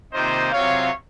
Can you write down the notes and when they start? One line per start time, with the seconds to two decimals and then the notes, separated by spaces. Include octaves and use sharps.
0.12 C3 D#3 A#3 F4 C5 D#5
0.51 C3 F#3 C4 F4 C#5 F5